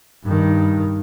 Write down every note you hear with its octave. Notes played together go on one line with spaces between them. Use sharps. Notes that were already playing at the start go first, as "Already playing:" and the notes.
G2 D#3